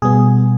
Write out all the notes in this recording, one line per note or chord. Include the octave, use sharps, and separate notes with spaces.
B2 G3 B3 G#4